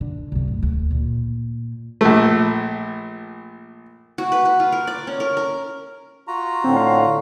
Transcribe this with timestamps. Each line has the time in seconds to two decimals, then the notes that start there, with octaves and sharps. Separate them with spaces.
0.01 D3
0.32 C2 F#2
0.48 A2
0.63 D2
0.91 A#2
2.01 A#1 A3
4.18 F#4
4.32 B4
4.45 B4
4.60 F4
4.72 A#4
4.87 D5
5.07 C#4
5.20 A#4
5.37 A#4
6.27 F4 F#4 A#5
6.64 A2 D3 C4
6.77 F5